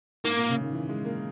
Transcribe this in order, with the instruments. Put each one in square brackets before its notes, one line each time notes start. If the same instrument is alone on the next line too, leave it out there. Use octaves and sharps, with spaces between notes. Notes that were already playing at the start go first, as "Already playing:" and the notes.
[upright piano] G#2 [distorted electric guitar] A#3
[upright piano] A#2
C#3
D#3
E3
G#3
A#3